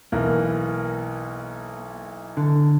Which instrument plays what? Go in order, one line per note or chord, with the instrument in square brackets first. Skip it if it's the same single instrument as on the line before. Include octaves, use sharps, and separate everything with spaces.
[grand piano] B1 E3 [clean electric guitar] A#3
[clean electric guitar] D3